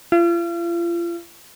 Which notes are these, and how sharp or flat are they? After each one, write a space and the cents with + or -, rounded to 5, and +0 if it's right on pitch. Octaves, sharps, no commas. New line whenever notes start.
F4 -40